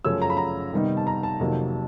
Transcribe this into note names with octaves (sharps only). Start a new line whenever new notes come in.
F#2 C#3 F3 A3 C#4 E6
A#5
B5
A#5
C3 D#3 G3 B3 D#4
A5
A#5
A5
F2 C3 D#3 F#3 A#3